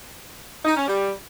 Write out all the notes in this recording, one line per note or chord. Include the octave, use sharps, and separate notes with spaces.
D#4
C#4
G3